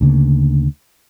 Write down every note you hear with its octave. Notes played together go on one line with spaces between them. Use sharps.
D2 C#3 A#3